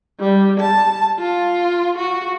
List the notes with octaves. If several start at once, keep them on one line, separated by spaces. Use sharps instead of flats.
G3
A5
F4
F#4